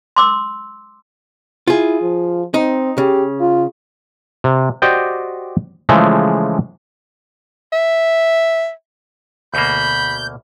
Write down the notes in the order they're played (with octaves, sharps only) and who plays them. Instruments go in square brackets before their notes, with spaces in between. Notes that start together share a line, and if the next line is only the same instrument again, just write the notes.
[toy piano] C6 D6 E6
[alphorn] E4 [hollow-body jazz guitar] F4 G#4
[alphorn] F3
[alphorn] C4 [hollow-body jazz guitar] D#4
[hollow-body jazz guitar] C#3 [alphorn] G4
[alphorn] F4
[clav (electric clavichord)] C3
F#4 G4 C5 D5 D#5 G5
C#3 E3 F3 G#3 A3
[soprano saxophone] E5
[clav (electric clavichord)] D2 B2 A#3 [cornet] B5 [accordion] G6